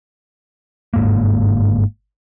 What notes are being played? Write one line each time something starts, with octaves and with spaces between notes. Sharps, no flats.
G1 G#2 A#3